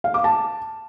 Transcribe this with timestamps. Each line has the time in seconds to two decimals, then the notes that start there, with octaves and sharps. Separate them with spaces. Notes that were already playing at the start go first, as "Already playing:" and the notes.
0.04 F5
0.14 D6
0.24 A5